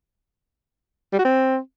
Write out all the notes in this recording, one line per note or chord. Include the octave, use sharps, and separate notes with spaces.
G3
F#4
C4